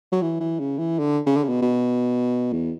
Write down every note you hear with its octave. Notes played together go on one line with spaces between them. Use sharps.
F#3
E3
E3
C#3
E3
D3
C#3
D3
C#3
B2
B2
E2